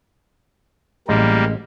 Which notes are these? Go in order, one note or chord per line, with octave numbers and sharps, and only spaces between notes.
A1 G3 G#3 A#3 A#5